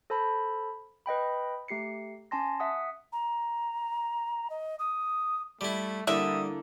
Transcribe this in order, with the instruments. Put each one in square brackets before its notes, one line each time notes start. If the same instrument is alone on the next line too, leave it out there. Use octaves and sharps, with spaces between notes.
[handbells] A4 C5 A5 B5
B4 D#5 G5 B5
A3 G4 C7 C#7
C#4 G#5 A5 C6 A#6
E5 F#5 D#6
[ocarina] A#5
D#5
D#6
[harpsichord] G3 E4 [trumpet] A3
[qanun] D3 A#3 E4 [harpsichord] G3 [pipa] E5 [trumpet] D#6